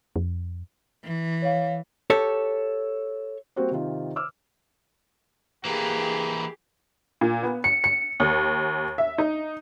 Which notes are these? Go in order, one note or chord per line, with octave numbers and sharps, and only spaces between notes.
F2
E3
C#5 F5
G4 A4 C#5
G3 A#3 C4 F#4 C5
C3 D#3 F4
D6 E6 F6
E3 A#3 G4 G#4
A#2
B3
C#7
C#7
D#2
E5
D#4